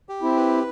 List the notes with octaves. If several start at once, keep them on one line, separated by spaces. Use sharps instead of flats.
G4
C4 E4
B4